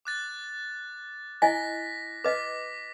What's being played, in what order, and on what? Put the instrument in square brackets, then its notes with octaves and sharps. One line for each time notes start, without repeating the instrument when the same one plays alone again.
[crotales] D6 F#6 A6
[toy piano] E4 D#5 G#5 [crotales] A#6 B6
[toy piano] B4 D#5 [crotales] D6 B6